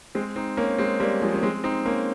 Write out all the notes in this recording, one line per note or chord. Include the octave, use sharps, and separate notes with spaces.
G#3 C4
C4 D#4
A#3 C#4
G#3 C4
G3 A#3
F3 G#3
C#4
G#3 C4
C4 D#4
A#3 C#4